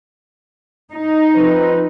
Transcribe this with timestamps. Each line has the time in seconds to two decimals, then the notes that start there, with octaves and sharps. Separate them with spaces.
0.92 D#4
1.35 F3 C4 B4